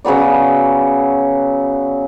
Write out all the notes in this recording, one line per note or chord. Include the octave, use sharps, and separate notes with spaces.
C#3 F#3 B3 D5